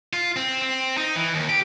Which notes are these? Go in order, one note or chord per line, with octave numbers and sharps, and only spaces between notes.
F4
C4
C4
D#4
E3
D#2
G4